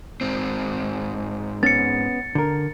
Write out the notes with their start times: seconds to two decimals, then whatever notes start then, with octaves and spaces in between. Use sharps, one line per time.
0.21 G#2 C4
1.63 B3 C#4 A6 C#7
2.35 D3 A#4